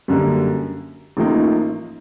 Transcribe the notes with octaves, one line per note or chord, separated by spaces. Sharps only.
F#2 D3 G3 A#3
A1 A2 F3 A#3 D#4